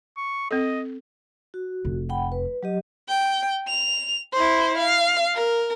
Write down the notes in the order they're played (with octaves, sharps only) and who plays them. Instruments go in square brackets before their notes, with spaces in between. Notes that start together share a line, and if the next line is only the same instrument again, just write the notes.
[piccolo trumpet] C#6
[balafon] C4 A4 [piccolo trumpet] D#5
[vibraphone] F#4
[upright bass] F1
[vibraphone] F#5 G5 B5
B4
F#3 G4 D#5
[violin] G5
F7
E4 C5
F5
A#4